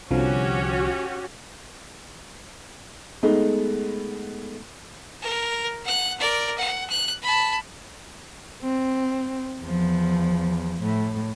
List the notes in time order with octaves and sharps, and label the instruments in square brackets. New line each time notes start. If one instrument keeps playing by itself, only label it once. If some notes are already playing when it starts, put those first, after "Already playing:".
[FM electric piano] C2 D3 F3 [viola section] C#4 F#4 G4
[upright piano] G#3 A3 B3 D#4
[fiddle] A#4
F#5 F#6
A#4 D5
F#5
F#6
A5 B5
[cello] C4
E2 F3
A2